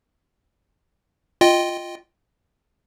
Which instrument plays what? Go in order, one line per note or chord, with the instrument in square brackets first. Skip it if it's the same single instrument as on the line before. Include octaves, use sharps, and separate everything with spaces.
[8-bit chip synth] F4 D#5 G5